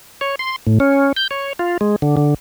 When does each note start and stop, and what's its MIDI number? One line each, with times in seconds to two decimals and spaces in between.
0.21 0.35 73
0.39 0.56 84
0.67 0.79 45
0.80 1.12 61
1.17 1.28 91
1.31 1.53 73
1.59 1.77 65
1.81 1.96 56
2.02 2.16 50
2.17 2.34 50